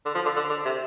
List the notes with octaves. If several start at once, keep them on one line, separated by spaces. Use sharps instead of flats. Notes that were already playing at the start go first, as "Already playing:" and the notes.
D3
F3
D3
D3
D3
C3